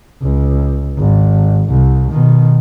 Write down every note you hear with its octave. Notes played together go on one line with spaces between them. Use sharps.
C#2
G#1
C2
B2 D#3